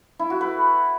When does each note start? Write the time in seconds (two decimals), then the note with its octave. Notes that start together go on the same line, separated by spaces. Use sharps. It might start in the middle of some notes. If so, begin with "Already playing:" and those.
0.19 E4
0.30 F#4
0.41 B4